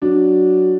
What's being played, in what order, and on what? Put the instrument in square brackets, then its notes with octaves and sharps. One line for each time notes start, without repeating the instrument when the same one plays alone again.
[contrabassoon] F#3 [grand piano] D4